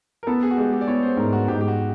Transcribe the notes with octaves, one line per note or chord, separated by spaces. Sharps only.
A#4
B3 A4
G#4
F#4
G#3 G4
G4
D5
B3 C#5
C5
G#2 A#4
F#4
G#2 G4
G4
F#4